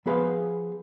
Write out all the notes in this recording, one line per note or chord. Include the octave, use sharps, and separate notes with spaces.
F3 B3 G#4 B4 C5 F5